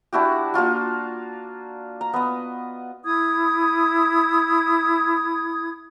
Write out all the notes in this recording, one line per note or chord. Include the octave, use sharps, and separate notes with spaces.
D4 E4 F#4 G4
A#3 D4 F4 F#4
A#5
B3 D#5
E4 D#6 G#6